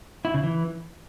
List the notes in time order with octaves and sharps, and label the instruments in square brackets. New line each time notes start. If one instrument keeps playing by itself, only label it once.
[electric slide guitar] E4
C#3
E3